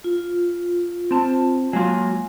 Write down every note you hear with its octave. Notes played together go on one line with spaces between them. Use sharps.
F4
C4 A5
F#3 G#3 A#3 F4